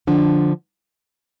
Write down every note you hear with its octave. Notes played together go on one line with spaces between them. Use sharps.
D3 F3 D4